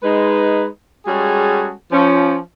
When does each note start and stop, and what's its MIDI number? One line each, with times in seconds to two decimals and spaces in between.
0.03 0.66 56
0.03 0.66 63
0.03 0.66 71
1.06 1.72 55
1.06 1.72 56
1.06 1.72 61
1.06 1.72 66
1.06 1.72 68
1.06 1.72 69
1.92 2.39 53
1.92 2.39 61